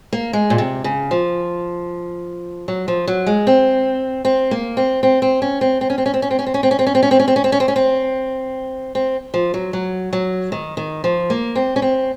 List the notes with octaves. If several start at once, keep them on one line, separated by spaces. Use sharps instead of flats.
A#3
G#3
A#2
C3
C#3
F3
F#3
F3
F#3
G#3
C4
C4
A#3
C4
C4
C4
C#4
C4
C4
C#4
C4
C#4
C4
C#4
C4
C#4
C4
C#4
C4
C#4
C4
C#4
C4
C#4
C4
C#4
C4
C#4
C4
C#4
C4
C#4
C4
C4
F3
F#3
F#3
F#3
D#3
D#3
F3
A#3
C4
C#4
C4